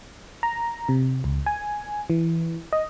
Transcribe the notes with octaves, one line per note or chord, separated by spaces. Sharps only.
A#5
C3
C#2
G#5
E3
D#5